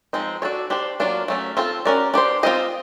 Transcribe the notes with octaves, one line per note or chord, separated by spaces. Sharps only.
F3 G#3 C4 D#4
D4 F#4 A4 C#5
D4 G4 C5
F#3 A#3 D4 F4
F#3 A3 C#4
C4 F4 A4
C#4 F#4 A#4 D5
D4 G4 C5
C4 F4 A4 C5 D#5